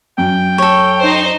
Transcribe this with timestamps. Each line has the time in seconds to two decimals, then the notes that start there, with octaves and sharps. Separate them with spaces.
0.18 F#2 G5
0.58 A4 C#5
1.01 D#4 C5